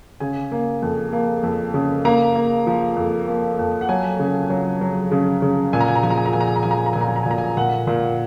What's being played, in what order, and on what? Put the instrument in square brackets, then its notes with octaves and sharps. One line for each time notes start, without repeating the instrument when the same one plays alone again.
[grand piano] C#3 G#5
A#3
F2
A#3
F2
C#3
A#3 A#5
A#3
F3
F2
A#3
F2
F#5
F#3 G#5
C#3
F#3
F#3
C#3
C#3
A#2 G#5
A#5
G#5
A#5
F3 G#5
A#5
G#5
A#5
A#2 G#5
A#5
G#5
A#5
G#5
F3
A#5
G#5
A#5
A#2 G#5
A#5
G#5
A#5
G#5
A#2 A#5
G#5
A#2 F#5
A#2